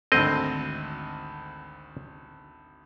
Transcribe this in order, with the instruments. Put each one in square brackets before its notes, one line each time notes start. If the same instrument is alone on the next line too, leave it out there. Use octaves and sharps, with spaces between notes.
[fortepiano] G#1 D2 A4 [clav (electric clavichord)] C4 D#5